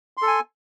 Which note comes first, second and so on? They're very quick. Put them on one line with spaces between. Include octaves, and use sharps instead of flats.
C6 A4 G#5